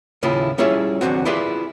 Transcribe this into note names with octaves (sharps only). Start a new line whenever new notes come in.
D#2 A2 C#3 E4 F4
G3 C#4 E4 F4 G#4 E5
B1 E2 D3 C4 F#4
E4 F4 G4 G#4 B4 D5